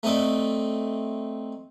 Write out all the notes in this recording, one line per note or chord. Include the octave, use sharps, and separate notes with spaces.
A3 C4 D#4 D5